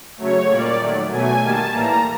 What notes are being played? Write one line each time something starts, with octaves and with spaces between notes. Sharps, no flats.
C#3 F#3 A3 C#5
A#2 G3 A#3 D5
D#3 F#3 A3
B2 F#3 A3 G#5
D#3 G3 A#3 A5
A2 E3 G3 A#3 A#5